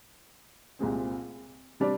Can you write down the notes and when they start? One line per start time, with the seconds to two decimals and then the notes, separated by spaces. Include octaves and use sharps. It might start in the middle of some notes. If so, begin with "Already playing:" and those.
0.79 C2 A#2 G#3 C4
1.80 C3 G3 D4